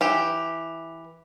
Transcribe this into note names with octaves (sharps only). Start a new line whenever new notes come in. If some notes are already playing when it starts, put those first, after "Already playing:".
E3 G4